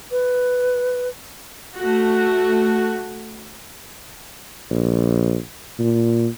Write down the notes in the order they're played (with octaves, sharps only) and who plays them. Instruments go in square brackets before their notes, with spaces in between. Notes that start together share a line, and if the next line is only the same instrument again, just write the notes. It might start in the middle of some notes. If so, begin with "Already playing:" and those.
[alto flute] B4
[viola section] A3 F#4
[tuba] A#1
A#2